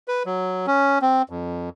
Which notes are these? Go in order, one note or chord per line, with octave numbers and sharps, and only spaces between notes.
B4
F#3
C#4
C4
F2